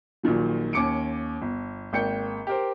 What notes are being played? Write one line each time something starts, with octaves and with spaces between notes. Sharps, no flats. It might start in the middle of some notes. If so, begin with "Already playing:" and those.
A#1 A#2 D#3 F#3
D#2 C#4 D6 C#7 D7
G1
G#1 A#3 G5 G6 C#7
G4 A#4 C5